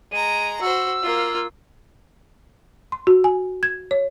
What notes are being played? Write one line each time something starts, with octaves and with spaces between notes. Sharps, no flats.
G#3 A#5 D#7
F#4 C5 E6
A#3 F4
C6
F#4
G#5
G#6
C#5